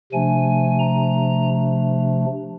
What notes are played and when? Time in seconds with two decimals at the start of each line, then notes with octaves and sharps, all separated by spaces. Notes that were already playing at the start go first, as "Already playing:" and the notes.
0.12 C3 F3 A3 D4 G#5
0.79 A#5